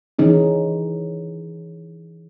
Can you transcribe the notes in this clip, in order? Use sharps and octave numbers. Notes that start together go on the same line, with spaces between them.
E3 C#4 D#4 G#4